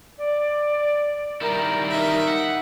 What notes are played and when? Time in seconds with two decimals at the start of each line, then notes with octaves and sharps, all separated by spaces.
0.18 D5
1.41 D#3 G3 E4 A#4
1.90 D#4 E5
2.28 F#5